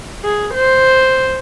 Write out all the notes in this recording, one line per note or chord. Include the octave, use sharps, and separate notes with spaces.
G#4
C5